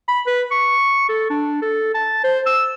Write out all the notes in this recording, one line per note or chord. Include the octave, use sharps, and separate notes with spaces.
B5
B4
C#6
A4
D4
A4
A5
C5
E6